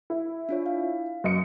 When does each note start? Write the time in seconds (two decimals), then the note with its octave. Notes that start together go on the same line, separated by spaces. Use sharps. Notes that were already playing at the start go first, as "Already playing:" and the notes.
0.10 E4
0.49 D4 F4 C#5
0.66 F5
1.24 F#2 D#5 C#7